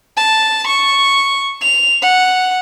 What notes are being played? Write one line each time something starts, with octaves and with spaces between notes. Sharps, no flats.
A5
C#6
F7
F#5